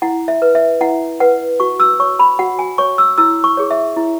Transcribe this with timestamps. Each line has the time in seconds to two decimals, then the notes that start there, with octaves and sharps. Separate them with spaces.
0.02 E4 F#5
0.28 E5
0.42 B4
0.55 E5
0.81 E4 F#5
1.20 B4 F#5
1.60 F#4 C#6
1.80 E6
2.00 C#5 C#6
2.19 B5
2.39 F#4 F#5
2.59 G#5
2.78 C#5 C#6
2.98 E6
3.18 E4 E6
3.44 C#6
3.57 G#4 C#5
3.71 E5
3.97 E4